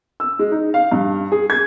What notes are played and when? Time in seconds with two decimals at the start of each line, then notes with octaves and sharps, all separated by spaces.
0.20 E6
0.39 G#3
0.52 D#4
0.74 F5
0.92 G2
1.32 G#4
1.50 G#6